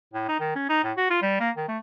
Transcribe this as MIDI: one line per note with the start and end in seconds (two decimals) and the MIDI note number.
0.14 0.25 45
0.28 0.39 63
0.40 0.55 51
0.55 0.67 61
0.69 0.84 63
0.84 0.92 45
0.97 1.07 66
1.10 1.19 65
1.22 1.39 55
1.40 1.50 58
1.57 1.66 51
1.68 1.78 57